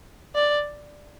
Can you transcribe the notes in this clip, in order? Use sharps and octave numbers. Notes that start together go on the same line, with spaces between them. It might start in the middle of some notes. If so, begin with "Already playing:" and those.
D5